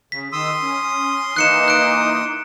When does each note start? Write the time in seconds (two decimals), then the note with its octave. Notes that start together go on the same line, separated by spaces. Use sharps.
0.12 C#3 B6
0.32 D#3 C6 D#6 E6
0.62 C#4
1.36 E3 A#3 D#4 F#6 C#7 E7
1.68 F#6 D7